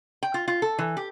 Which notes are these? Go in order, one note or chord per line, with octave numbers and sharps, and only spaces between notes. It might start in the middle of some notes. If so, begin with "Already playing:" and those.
G5
F4
F4
A4
E3
G4